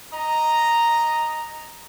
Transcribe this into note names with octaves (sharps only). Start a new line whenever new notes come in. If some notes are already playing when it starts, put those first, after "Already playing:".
D#5 A#5